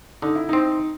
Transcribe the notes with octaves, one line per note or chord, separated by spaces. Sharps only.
D3 D#4
E4
C4 D#4